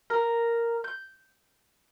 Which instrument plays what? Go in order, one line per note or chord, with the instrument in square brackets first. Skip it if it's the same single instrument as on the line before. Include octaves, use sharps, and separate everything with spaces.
[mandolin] A#4
G6